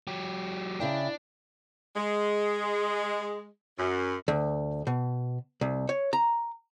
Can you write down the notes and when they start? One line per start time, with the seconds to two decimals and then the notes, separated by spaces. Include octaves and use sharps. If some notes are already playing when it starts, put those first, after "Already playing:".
0.07 F#3 G4
0.80 C#3 D4 E4 G5
1.96 G#3
3.79 F#2
4.28 D2
4.87 B2
5.61 C2
5.89 C#5
6.13 A#5